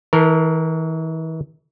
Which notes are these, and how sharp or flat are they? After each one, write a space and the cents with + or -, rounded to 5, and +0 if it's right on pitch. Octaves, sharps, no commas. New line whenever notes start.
E3 -40 A#4 -10 A5 +0